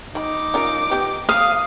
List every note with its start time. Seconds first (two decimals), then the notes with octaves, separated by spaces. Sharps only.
0.15 D#3 D#4 B5 D6
0.54 C#4 F4 A#4
0.90 B3 G4 B4
1.29 F5 D#6